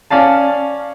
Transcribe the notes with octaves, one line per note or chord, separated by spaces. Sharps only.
C#4 D5 F5 A5